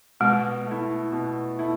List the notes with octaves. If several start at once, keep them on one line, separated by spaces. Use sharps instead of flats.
B2 G#3
A3 E4
B2
A3 E4